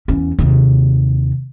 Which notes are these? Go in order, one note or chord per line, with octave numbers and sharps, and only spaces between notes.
E2 C#4
D#2 C3